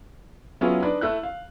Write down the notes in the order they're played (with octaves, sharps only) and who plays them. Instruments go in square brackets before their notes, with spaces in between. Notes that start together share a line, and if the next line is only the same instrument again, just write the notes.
[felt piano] F#3 B3 C#4 E4 F4 G#4
D4 D#4 B4 D5
A3 E4 F#6
F5